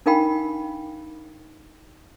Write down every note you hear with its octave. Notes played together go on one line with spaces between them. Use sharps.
D4 D#4 A#4 F5 G5 B5